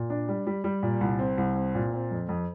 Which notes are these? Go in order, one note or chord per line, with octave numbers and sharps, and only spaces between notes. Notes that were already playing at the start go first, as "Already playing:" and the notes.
Already playing: A#2
D4
G3
G3
G3
A#2
C2
C4
C2
C4
A#2
C4
F2
F2